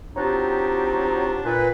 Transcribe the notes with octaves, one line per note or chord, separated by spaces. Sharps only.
F#3 C4 D4 D#4 F4 G4
A#2 B4